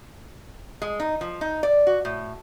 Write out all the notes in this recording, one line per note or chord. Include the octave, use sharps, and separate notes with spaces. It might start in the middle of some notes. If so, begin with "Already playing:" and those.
G#3
D#4
F3
D#4
D5
F#4
A2